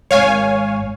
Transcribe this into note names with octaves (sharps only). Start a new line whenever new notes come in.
G#1 G#2 C#5 F5 G#5